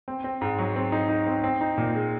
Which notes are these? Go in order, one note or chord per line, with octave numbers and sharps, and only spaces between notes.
C4
C4
G#2
F#3
C4
D#4
D#4
C4
C4
D#4
A#2
G#3